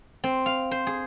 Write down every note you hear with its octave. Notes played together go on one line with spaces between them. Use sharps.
C4
F5
C5
G#4